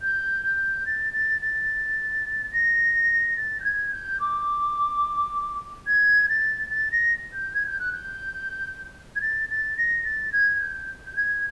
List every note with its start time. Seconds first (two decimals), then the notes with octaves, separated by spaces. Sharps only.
0.01 G6
0.43 G6
0.85 A6
1.13 A6
1.41 A6
2.52 A#6
3.36 A6
3.60 G6
3.64 G#6
3.92 G6
4.19 D6
5.86 G#6
6.28 A6
6.70 A6
6.91 A#6
7.33 G6
7.54 G#6
7.66 G6
7.79 F#6
7.92 G6
9.15 G#6
9.21 A6
9.49 A6
9.77 A#6
10.04 A6
10.32 G#6
10.60 G6
11.06 G6
11.16 G#6